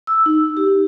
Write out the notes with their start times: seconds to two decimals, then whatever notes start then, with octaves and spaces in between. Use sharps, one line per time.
0.07 E6
0.26 D#4
0.57 G4